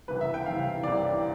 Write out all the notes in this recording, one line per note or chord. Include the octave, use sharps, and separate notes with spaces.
C2 C3 E3 B4
E5
G5
C2 C3 E3 F5
C2 C3 E3 D5